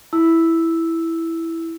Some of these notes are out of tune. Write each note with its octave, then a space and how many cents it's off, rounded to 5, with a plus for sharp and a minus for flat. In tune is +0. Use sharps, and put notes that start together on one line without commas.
E4 +0 E6 +0